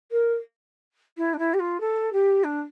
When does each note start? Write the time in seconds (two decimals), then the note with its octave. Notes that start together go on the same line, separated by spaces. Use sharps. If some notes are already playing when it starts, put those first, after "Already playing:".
0.11 A#4
1.17 E4
1.33 D4
1.39 E4
1.53 G4
1.59 F4
1.80 A4
2.12 G4
2.44 D4